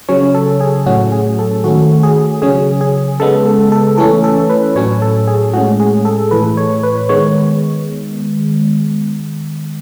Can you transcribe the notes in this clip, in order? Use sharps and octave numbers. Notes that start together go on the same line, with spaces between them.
C#3 F#3 C#4 C#5
A4
G#4
A2 F#3 C#4 F#4
G#4
A4
D#3 A3 C#4 F#4
G#4
C#3 F#3 C#4 G#4
G#4
C#3 G#3 B3 A4
A4
A4
E3 A3 C#4 A4
A4
B4
A2 F#3 C#4 C#5
A4
G#4
A2 G#3 C#4 F#4
G#4
A4
A2 E3 A3 B4
C#5
B4
D#3 G#3 B3 C#5